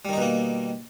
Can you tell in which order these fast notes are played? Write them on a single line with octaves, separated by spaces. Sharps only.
G3 D#3 D#4 B2 A#3